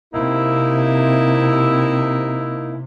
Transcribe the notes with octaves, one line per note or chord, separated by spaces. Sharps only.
C3 A#3 D#4 E4